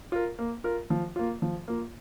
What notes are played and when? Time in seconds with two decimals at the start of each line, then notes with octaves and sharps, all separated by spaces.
0.12 F4 A#4
0.39 A#3
0.64 F4 A#4
0.90 F3
1.16 A#3 F4
1.42 F3
1.68 A#3 F4